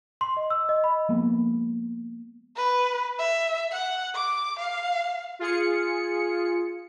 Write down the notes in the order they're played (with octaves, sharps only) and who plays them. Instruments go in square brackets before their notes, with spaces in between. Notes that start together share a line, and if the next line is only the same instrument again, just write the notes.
[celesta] C6
D#5
E6
D#5
B5
[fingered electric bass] F3 G#3 A#3 B3
[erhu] B4
E5
F#5
D6
F5
[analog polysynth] F4 G#4 C#7